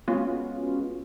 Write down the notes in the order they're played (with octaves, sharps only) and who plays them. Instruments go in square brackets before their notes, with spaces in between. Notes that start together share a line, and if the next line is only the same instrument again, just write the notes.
[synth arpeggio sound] G#3 B3 C#4 F4 F#4